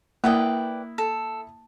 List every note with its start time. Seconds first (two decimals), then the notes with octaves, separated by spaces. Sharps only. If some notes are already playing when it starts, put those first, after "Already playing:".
0.24 A#3 E4 A#4 B4 D5 G5 D#6
0.98 A4